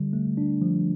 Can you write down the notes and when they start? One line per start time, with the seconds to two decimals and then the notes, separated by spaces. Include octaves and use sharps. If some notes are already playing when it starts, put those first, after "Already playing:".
Already playing: D3 G3
0.13 A3
0.37 D4
0.62 F3